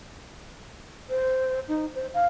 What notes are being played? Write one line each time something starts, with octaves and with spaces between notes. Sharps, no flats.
C5
D#4
C5
F5